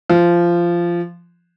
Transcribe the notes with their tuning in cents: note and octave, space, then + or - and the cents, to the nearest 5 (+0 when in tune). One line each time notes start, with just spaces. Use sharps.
F3 -15